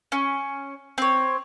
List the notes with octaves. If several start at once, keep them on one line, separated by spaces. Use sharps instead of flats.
C#4
C4 C#5